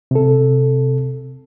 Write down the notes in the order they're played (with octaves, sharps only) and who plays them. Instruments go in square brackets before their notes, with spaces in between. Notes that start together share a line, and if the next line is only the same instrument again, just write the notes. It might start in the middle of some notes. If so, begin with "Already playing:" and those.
[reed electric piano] C3 A4